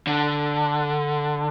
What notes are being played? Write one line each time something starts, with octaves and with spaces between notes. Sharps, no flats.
D3